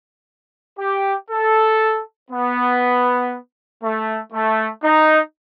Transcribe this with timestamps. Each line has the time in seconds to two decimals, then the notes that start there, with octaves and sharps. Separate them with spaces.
0.79 G4
1.30 A4
2.31 B3
3.83 A3
4.33 A3
4.83 D#4